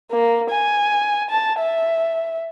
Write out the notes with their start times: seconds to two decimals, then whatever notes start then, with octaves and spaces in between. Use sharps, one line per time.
0.11 A#3
0.50 G#5
1.30 A5
1.59 E5